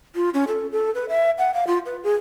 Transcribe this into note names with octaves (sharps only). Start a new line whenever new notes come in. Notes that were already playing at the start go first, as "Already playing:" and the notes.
F4
C#4
A4
A4
B4
E5
F#5
F5
F4
B4
G#4